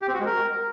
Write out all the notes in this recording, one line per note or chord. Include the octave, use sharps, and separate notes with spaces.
G4
C4
F#4
G#3
A#4